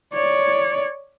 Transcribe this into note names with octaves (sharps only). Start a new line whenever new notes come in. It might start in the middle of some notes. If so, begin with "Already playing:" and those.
C#5 D5